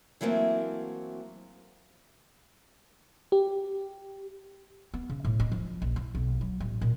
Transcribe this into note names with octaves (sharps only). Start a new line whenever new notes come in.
E3 F#3 A3 A#3 C4
G4
B3
C#3
A2
D#4
F3
A#1
E4
B1
F#3
A1
A#2